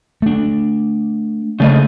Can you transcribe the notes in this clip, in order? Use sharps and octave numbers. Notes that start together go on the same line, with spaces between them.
A3 D4
C#3 A3 D#5